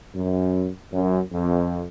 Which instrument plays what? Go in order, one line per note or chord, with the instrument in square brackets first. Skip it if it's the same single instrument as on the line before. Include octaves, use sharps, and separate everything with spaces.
[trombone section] F#2
F#2
F2